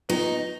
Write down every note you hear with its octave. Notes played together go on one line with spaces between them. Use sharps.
B3 D#4 F4 B4